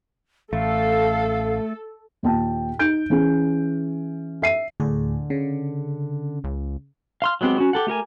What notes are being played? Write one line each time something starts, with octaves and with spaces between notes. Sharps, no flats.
A1 A3 A4 F5
D#2 A#2 G5 A5
D#4 G6 D7
E3 C#4 G#4
E5 C7 D#7
D2 A2 D3 G#4
C#3
C#2
F5 C6 F6
F#3 G#3 B3 C4 G4
C#4 F#4
G4 A4 F#5
A3 G4 A#4 G#5